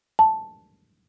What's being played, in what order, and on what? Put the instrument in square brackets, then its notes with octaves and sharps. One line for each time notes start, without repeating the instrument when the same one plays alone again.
[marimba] A5